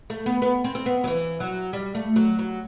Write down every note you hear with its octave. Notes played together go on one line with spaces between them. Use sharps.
A3
B3
B3
C4
C4
B3
F#3
E3
F#3
G3
A3
F#3
F#3